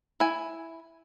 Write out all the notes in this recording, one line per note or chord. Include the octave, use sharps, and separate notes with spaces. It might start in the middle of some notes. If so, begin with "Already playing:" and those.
E4 G#5